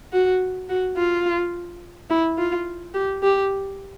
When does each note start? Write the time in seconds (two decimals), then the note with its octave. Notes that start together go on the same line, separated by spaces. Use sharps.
0.13 F#4
0.69 F#4
0.97 F4
2.10 E4
2.38 F4
2.94 G4
3.23 G4